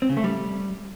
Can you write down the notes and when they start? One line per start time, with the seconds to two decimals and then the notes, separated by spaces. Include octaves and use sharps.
0.02 C4
0.09 C#3
0.17 A3
0.24 G3